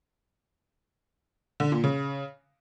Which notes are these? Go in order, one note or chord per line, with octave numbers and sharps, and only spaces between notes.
D3
A#2
C#3